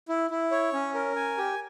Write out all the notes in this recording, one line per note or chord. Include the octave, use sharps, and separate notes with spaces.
E4
E4
C#5
C#4
A#4
G#5
G4